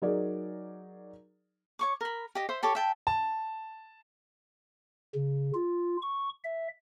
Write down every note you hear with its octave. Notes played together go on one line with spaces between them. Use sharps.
F#3 D#4 G#4 A#4 D5
C#5 C#6 D6
A#4 B5
G4 D#5
C5 E5 C6
G4 A4 C#5 D6
E5 G5 A5
A5
C#3
F4
C#6
E5